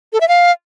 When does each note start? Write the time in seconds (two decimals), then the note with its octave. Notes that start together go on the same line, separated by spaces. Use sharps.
0.13 A4
0.21 E5
0.28 F5